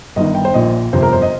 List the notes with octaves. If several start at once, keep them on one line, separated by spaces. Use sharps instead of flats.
G1 G2 D#3 D#5
G5
C5
A#1 A#2 D#5
G1 F2 C3 C5
A#4
C5
D#5